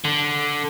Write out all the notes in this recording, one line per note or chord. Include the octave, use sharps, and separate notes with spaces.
D3